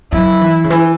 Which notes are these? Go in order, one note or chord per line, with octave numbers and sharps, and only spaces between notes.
F#3 E4
E3
C#3
E3